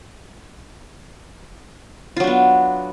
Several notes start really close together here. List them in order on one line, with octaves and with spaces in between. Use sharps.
F4 F#3 D4 B3